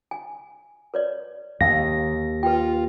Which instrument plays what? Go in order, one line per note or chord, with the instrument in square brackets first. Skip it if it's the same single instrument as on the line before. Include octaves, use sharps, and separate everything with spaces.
[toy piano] G#5
B4 C#5 D5
[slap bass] D#2 [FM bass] D#3 [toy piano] F5 [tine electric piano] A#6
[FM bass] F4 [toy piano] B4 G5